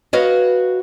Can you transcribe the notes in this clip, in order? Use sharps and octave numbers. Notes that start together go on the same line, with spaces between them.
F#4 B4 C#5 D#5 F5